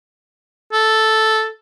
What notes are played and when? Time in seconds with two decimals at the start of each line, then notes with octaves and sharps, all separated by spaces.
0.73 A4